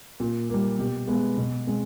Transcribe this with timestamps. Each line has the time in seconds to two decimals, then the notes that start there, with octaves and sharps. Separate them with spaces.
0.20 A#2
0.50 G3 A#3
0.79 B2 G4
1.07 G#3 B3
1.37 B2
1.67 G#3 C4